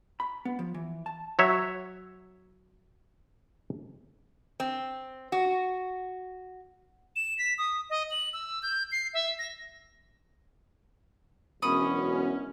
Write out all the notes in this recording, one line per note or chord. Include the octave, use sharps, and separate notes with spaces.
B5
B3
F3
E3
A5
F#3 C#5 E5
C4
F#4
E7
B6
D#6
D#5
F#7
E6
G6
C7
E5
A#6
E1 F#2 B3 C#4 B5 C#6 D#6